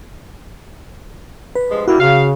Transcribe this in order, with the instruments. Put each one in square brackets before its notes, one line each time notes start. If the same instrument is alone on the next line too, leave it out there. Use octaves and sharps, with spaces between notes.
[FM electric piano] B4
[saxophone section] G2 F3 G#3
[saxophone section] G3 A#3 [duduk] E4 [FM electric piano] F#4
[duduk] C#3 [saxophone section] F5